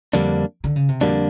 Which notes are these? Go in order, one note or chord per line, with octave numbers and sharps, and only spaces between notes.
F2 D3 G3 A#3 D4
D3
C#3
C3
F2 B2 D3 G3 A#3 D4